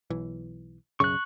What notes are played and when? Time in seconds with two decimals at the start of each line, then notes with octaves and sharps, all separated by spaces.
0.10 B1 E3
1.00 B1 F#2 C#3 C#6 F#6